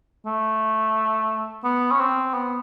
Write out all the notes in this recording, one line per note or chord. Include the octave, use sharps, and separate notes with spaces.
A3
B3
C#4
C4
B3